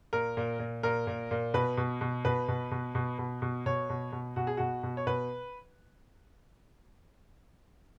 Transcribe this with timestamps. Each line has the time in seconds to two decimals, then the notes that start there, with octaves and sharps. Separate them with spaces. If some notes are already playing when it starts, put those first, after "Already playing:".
0.13 A#2 A#4
0.37 A#2
0.59 A#2
0.83 A#2 A#4
1.07 A#2
1.31 A#2
1.54 B2 B4
1.77 B2
2.01 B2
2.25 B2 B4
2.48 B2
2.71 B2
2.95 B2
3.18 B2
3.42 B2
3.66 B2 C#5
3.90 B2
4.12 B2
4.36 B2 F#4
4.47 G#4
4.57 B2 F#4
4.83 B2
4.97 C#5
5.07 B2 B4